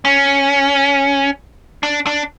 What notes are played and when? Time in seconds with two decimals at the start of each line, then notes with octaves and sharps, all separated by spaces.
0.05 C#4
1.83 D4
2.06 D4